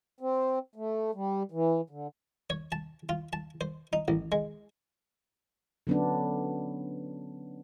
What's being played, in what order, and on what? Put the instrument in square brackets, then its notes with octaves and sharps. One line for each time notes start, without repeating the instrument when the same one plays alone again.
[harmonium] C4
A3
G3
E3
D3
[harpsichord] C#5
A5
F4
A5
C5
D#4
A1
G#3
[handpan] D3 F#3 B3 C#4 D4